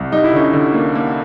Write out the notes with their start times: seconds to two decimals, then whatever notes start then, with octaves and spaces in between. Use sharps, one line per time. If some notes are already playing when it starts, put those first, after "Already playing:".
Already playing: C2
0.12 G3 D#4
0.24 E4
0.33 D3 C#4 D#4
0.53 D3
0.74 A#3
0.95 A#3